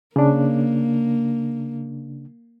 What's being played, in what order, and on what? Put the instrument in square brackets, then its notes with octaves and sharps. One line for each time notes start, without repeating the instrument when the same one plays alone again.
[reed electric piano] C#3 D4 [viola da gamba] A#3